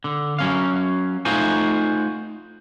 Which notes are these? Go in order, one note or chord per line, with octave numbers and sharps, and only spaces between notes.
D3
F#3 C#4 F5
A3 D#4 F4 F#4 C5 G#5